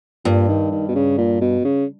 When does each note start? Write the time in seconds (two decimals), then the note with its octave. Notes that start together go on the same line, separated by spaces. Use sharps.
0.25 G2 A#2
0.48 D#3
0.72 D#3
0.88 B2
0.95 C#3
1.18 A#2
1.41 B2
1.65 C#3